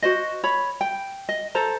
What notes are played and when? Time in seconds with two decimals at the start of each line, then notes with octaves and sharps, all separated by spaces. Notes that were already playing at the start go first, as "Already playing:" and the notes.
0.02 F#4 C5 D#5
0.44 C#5 B5
0.81 G5
1.29 D#5
1.55 A4 C5 A#5